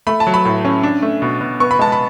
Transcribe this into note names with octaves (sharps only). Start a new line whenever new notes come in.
A3 B5
A5
F#3
B5
A2
C#4
D4
A3
B2
B2
B3 C#6
B5
G#3 A5
B5